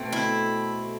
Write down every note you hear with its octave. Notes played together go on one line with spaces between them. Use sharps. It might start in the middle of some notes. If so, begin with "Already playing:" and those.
Already playing: B2 A3 C4
E4